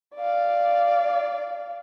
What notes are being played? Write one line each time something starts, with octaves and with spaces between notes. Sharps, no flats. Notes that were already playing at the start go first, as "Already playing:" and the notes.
D5 F5